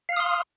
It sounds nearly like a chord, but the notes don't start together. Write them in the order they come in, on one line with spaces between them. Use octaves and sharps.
F5 F6 D#6 C6